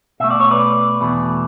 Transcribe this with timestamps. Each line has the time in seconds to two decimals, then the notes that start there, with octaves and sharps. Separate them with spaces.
0.20 B2 A3 E5
0.31 D5
0.40 C#5
0.51 B4 D5
1.00 E2 B2 A3